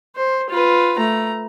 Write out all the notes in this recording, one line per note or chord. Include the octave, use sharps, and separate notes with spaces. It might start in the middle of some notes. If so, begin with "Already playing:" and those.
C5
F4 B4
A3 A#5